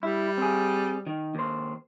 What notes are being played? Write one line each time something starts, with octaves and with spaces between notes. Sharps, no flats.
G3 E4
C4 G#4
D#3
D#2 C5